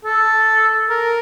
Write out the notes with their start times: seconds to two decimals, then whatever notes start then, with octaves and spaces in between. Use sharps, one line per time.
0.05 A4
0.90 A#4